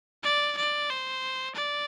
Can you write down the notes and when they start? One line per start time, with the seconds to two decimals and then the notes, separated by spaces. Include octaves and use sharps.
0.23 D5
0.57 D5
0.89 C5
1.55 D5